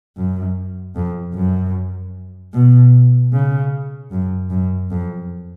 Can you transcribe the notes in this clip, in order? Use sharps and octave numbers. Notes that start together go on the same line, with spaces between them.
F#2
F2
F#2
B2
C#3
F#2
F#2
F2